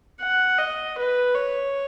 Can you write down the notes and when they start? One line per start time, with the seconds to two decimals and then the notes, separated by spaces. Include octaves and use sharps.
0.21 F#5
0.58 D#5
0.98 B4
1.35 C#5